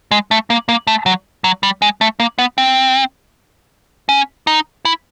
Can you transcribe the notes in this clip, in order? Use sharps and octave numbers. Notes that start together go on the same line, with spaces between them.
G#3
A3
A#3
A#3
A3
F#3
F#3
G3
G#3
A3
A#3
B3
C4
C#4
D#4
E4